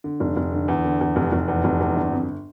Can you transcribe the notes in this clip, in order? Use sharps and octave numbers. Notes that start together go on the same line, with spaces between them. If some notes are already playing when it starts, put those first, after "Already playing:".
D3
F1
F1
D3
E2
D3
E2
F1
F1
E2
F1
E2
G1
F2